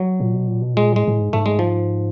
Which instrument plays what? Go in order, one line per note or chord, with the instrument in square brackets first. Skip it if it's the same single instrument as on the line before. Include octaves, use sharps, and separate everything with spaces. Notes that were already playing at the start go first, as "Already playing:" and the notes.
Already playing: [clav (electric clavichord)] F#3
[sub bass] A#2
B2
A#2
B2
[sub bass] A#2 [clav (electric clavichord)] G#3
[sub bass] A2 [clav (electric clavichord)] G#3
[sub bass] A2
G#2
[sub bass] G#2 [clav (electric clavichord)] A3
[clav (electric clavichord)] G#3
F3